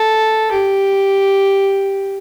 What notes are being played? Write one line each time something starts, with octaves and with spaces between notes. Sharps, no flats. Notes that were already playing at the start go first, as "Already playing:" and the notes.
Already playing: A4
G4